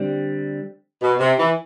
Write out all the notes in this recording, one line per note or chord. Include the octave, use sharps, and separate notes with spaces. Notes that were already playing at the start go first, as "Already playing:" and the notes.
Already playing: D3 G3 C4
B2
C3
E3